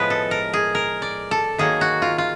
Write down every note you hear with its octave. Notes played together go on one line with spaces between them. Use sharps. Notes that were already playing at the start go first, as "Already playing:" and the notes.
Already playing: A2 F3 G#3 B3 B4
A4
A#4
G#4
A#4
D5
A4
D#3 F#3 A#3 G#4
F#4
F4
F4